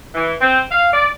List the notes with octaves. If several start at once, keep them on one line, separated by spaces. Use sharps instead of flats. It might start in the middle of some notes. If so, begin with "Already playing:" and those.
E3
C4
F5
D5